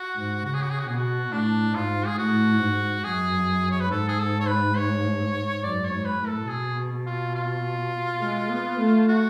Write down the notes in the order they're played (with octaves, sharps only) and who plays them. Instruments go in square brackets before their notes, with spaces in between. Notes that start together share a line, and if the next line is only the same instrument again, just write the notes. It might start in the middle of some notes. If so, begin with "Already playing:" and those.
Already playing: [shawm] F#4
[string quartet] G#2
[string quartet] C#3 [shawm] F#4
[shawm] G#4
F#4
G#4
F#4
[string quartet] B2 [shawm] G#4
[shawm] F#4
[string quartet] A2 [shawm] D4
[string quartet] G#2 [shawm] F4
[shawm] G#4
[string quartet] A2 [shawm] F#4
[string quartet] G#2
[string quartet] F#2 [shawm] G#4
[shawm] C#5
B4
[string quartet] G#2 [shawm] A4
[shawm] G#4
A4
C#5
B4
C#5
[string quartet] F#2 [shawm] D5
[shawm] C#5
[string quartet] G#2
[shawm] B4
[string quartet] A2
[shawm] A4
[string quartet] B2 [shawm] G#4
[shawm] F4
F4
[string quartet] G#3
B3
A3
[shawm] F#4